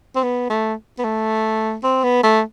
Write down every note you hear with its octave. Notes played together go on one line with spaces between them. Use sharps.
C4
B3
A3
B3
A3
C4
B3
A3